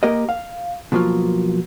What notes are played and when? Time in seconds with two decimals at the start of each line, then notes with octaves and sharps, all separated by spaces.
0.03 A#3 G4 A#4 D#5
0.29 F5
0.92 B2 F3 F#3 A#3 F4